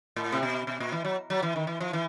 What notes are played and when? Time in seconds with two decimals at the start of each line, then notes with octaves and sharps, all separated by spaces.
0.16 A2
0.32 C3
0.43 B2
0.67 B2
0.80 A#2
0.92 E3
1.05 F#3
1.30 F#3
1.42 E3
1.56 D#3
1.67 E3
1.80 F3
1.93 E3